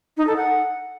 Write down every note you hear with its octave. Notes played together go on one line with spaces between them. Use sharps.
D#4
A4
F#5